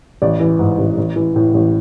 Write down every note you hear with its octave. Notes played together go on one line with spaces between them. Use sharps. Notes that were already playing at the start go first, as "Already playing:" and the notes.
A1 D5
E3
G#2
A1
A1
E3
A2
A1